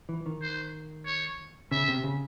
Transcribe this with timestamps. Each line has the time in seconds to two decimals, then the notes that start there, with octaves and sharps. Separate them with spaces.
0.09 E3
0.26 D#3
0.42 C5
1.06 C#5
1.71 C#3 E5
1.88 C3
2.04 C#3